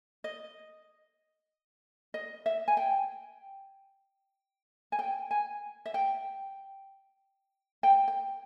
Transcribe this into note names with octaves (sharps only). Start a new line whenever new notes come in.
D#5
D#5
E5
G#5
G5
G#5
G5
G#5
E5
G5
G5
G5